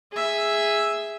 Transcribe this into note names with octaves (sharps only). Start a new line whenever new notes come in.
G#4 E5